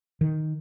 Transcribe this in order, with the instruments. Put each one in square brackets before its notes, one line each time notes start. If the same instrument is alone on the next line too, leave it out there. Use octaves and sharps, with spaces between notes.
[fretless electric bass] D#3